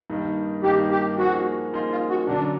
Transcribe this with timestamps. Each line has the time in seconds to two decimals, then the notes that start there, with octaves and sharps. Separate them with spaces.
0.10 G2 D#3 G3 A#3 D#4
0.63 G2 D#3 G3 A#3 D#4 G4
0.91 G4
1.18 F3 A#3 D#4 F#4 G#4
1.73 F3 A#3 D#4 F4 G#4
1.91 F4
2.10 F#4
2.27 F#2 D3 F#3 D4